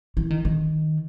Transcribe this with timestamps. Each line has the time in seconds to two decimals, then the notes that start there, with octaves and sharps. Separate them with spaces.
0.17 E3
0.30 D#3
0.45 D#3